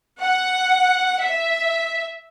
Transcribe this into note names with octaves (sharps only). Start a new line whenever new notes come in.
F#5
E5